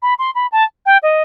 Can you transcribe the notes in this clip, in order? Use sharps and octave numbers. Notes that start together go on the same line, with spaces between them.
B5
C6
B5
A5
G5
D#5